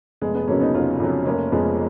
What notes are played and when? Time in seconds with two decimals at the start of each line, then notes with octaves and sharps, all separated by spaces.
0.21 F1 G#3 B3
0.35 G#3 B3
0.48 F2 C#3 F#3 A#3 C#4
0.60 B3 D#4
0.74 F1 C#4 F4
1.00 F2 C#3 F#3
1.26 F1 A#3 C#4
1.52 F2 F3 G#3 B3